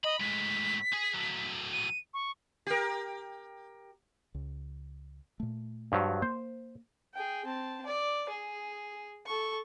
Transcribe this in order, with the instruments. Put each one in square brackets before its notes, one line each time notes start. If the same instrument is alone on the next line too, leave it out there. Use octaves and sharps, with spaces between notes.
[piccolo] D#5 [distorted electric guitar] B5
[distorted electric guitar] A2 G#3 [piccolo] B6
[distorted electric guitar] G#4
F#3 A3
[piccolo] D#7
C#6
[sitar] G4 A#4
[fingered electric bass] C#2
A#2 A3
[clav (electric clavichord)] G2 F3 F#3
[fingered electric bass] A#3 [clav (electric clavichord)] C5
[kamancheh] G#4 G5
C4 A5
D5
G#4
A4 C#6